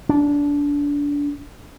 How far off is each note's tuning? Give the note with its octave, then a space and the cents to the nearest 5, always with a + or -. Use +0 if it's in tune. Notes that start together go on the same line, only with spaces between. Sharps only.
D4 -25